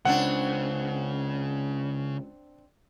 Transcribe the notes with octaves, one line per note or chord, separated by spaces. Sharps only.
C#2 C#3 C4 D4 F#5